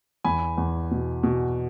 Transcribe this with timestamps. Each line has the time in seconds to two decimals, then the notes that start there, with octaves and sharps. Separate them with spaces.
0.24 E2 G#5 B5
0.58 E2
0.91 B2
1.23 B2